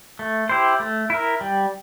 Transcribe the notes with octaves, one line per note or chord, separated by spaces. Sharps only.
A3
E4 G4 C5
A3
E4 A#4
G3